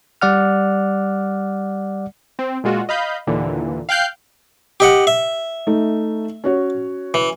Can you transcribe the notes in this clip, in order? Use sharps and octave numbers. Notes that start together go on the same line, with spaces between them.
G3 D5 F#5 F6
C4
A#2 G#3 F4 F#4
D#5 F5 B5 G6
D#2 A#2 D3 E3
F5 G5 F#6 G6 C7
G4 D#5 F#5
E5
A3 D#4
C#4 F#4 C#5
E3